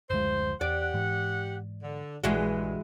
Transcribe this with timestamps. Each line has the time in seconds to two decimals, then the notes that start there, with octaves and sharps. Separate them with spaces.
0.10 F#1 D2 F3 G#3 C5
0.61 E2 G4 D5 F#5
0.94 G#2 E3
1.83 D3
2.24 A#1 G2 E3 G#3 F#4